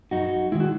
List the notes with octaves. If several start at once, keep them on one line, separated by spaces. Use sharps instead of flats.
F#2 D#4 F#4
D#3 G#3 E4
F#4